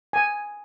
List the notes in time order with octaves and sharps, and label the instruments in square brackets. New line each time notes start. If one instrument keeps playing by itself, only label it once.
[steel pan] G#5